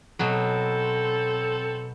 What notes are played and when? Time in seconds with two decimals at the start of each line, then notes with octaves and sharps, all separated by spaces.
0.19 B2 F#3 C4 A4